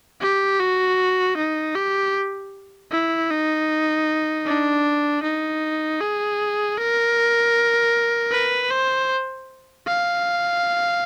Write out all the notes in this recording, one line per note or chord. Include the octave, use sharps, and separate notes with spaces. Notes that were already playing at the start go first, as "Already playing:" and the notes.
G4
F#4
D#4
G4
E4
D#4
D4
D#4
G#4
A#4
B4
C5
F5